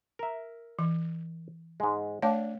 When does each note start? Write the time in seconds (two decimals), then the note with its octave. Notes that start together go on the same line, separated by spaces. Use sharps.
0.19 A#4 E5
0.79 E3
1.80 G#2 G#3
2.22 A3 D4 C#5 F5